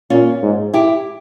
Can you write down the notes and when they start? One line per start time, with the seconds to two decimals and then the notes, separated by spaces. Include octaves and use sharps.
0.10 A#2 C#4 F4
0.42 G#2
0.74 E4 G4